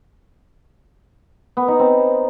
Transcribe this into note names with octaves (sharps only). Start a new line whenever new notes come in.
B3
D#4
C4